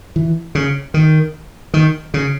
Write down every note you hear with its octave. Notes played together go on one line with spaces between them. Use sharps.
E3
C#3
D#3
D#3
C#3